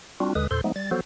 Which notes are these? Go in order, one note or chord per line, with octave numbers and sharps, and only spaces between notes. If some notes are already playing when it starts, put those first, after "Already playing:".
G3 C4 D4 F4 F#4
D#2 D3 G#3 B4 D#6
E2 A#2 A4 C5 C6
F3 G#3 A3 B3 D#4
G3 A6
F3 F#3 B3 F#4 A4 C5